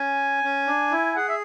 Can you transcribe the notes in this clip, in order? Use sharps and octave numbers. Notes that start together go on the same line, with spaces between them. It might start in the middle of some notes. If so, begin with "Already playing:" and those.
Already playing: C#4 G#5
C#4
D4
E4
G#4 F#5
E5